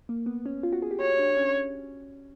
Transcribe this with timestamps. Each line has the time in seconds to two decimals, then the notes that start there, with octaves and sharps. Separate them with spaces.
0.09 A#3
0.26 B3
0.46 C#4
0.63 F4
0.72 F#4
0.82 G#4
0.91 G4
1.00 F#4 C#5
1.19 D4
1.37 C#4